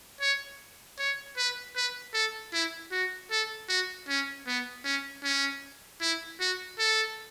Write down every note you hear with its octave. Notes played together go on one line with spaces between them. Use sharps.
C#5
C#5
B4
B4
A4
E4
F#4
A4
F#4
C#4
B3
C#4
C#4
E4
F#4
A4